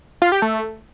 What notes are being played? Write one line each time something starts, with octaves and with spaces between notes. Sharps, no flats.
F4
G4
A3